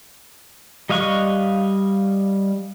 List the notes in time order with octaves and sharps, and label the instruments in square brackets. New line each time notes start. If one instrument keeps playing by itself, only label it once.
[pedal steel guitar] G3 D#5 F5 C#6 F#6